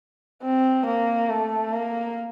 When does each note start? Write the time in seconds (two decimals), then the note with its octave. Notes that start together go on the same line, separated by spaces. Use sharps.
0.43 C4
0.86 A#3
1.29 A3
1.73 A#3